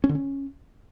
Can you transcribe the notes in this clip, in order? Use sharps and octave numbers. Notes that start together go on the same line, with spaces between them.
C#4
D3
C#4